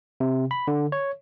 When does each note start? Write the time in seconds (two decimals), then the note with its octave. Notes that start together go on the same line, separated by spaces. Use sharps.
0.20 C3
0.51 B5
0.68 D3
0.92 C#5